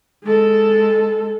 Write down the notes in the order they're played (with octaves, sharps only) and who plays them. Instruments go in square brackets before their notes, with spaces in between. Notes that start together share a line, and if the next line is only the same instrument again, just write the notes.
[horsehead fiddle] G#3 A4